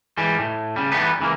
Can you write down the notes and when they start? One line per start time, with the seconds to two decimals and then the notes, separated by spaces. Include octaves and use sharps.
0.17 E3 G3 G#3
0.39 A2
0.76 C#3 G3
0.92 E3 G3 A3 B3 D#4 B4
1.19 C#2 E3 A#3